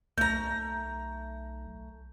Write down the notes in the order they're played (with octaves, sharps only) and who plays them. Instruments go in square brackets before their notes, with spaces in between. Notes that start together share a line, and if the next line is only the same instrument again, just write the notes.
[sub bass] B1 [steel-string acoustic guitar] A3 A#5 [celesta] G6